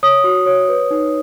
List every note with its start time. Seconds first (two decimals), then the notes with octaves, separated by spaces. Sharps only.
0.03 C#5 D#6
0.24 F#4
0.46 C#5
0.69 B4
0.91 D#4